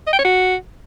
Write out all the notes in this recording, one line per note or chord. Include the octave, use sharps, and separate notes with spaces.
D#5
G5
C#5
F#4